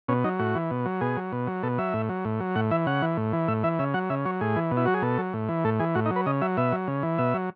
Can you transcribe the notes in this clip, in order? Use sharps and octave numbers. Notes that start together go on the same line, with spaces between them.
B2 C#4
F#3 D#4
A2 F#4
E3
B2
F#3
B2 G#4
F#3
B2
F#3
B2 A4
F#3 E5
A2
F#3
A2
F#3
A2 F#5
E3 E5
C#3 F#5
E3
A2
E3
A2 E5
E3 E5
C#3 E5
F#3 F#5
C#3 E5
F#3 C#5
A2 G#4
E3
B2
E4
F#3 F#4
G#4
B2 A4
F#3
A2
E3
A2 A4
E3 G#4
A2 F#4
D#4
F#3
B4
C#3 D#5
F#3 E5
B2 E5
F#3
C#3
E3
B2 E5
F#3